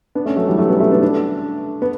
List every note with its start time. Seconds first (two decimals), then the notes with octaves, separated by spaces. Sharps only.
0.15 B3 D4
0.25 A3 C#4
0.37 F#3 A3
0.47 E3 G3
0.58 F#3 A3
0.69 G3 B3
0.80 A3 C#4
0.92 B3 D4
1.02 B3 D4
1.82 B3